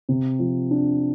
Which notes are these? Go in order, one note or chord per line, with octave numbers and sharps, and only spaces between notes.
C3
F3
D4